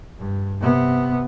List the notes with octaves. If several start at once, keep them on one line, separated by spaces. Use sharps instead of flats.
G2
C3 B3